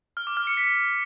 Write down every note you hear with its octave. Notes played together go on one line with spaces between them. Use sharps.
F6
D6
F6
C#7
B6